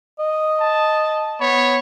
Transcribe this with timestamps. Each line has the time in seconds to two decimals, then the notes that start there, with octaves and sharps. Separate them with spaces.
0.19 D#5
0.60 A5
1.40 B3 C#5